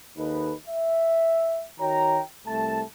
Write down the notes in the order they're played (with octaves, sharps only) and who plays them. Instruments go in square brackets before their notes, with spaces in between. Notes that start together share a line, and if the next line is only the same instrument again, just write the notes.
[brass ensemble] D#2 D#4 A4 B4
E5
D#3 F#4 C#5 G5 A#5
C2 A3 A5